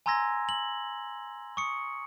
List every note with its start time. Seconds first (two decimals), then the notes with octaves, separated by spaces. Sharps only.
0.06 G#5 A#5 C6 E6 G#6 A#6
0.49 F#7
1.57 C#6 D#6 C#7